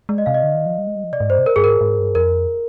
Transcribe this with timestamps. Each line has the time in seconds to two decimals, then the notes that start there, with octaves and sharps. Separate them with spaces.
0.09 G#3 D5
0.18 D#5
0.26 C3 F5
0.34 D#5
0.43 D3
0.55 D#3
0.66 F3
0.78 G3
0.87 G#3
0.95 G3
1.04 F3
1.13 C3 D5
1.20 G#2
1.30 G2 C5
1.38 C3
1.46 A#4
1.56 G2 G#4
1.64 G#2 A#4
1.81 G#2
1.99 G2
2.15 F2 A#4